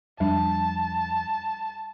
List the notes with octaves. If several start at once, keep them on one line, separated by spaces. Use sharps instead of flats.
F2 G3 D4 A5